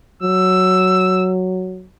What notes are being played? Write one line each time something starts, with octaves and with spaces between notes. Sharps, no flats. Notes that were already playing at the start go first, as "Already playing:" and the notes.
F#3 E6